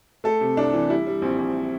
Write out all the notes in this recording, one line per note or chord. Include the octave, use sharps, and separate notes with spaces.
A3 A4
C3
C2 D4
E3
G3 E4
G3
A#1 C4
A#1